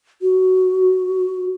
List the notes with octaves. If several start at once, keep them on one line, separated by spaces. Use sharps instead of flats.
F#4